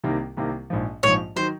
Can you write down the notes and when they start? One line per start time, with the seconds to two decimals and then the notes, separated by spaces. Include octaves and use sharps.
0.03 C2 C3 D#3 A#3
0.37 C2 C3 D#3 A#3
0.70 A#1 G#2 F3
1.03 A#1 G#2 F3 C#5
1.36 D#3 F#3 C5